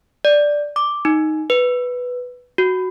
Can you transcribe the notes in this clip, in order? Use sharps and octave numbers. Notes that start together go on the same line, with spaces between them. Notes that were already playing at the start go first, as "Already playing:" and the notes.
D5
D6
D#4
B4
F#4